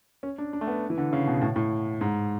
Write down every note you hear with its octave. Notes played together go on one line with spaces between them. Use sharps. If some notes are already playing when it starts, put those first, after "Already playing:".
C#4
D4
D4
A3
B3
E3
D3
C#3
B2
A2
A2
G#2